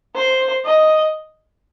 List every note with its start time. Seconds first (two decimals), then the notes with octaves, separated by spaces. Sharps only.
0.15 C5
0.65 D#5